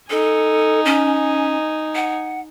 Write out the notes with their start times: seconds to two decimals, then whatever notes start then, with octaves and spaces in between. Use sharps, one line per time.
0.10 D#4 A4 G#5
0.85 C#4
1.95 F#5